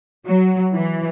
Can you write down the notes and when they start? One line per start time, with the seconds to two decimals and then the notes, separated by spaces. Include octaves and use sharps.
0.25 F#3
0.73 E3